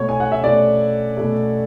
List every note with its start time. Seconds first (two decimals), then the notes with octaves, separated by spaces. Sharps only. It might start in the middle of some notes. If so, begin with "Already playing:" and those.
Already playing: B2 A3 C#5
0.09 G#5
0.20 F#5
0.32 E5
0.44 B2 A3 D5
1.17 B2 A3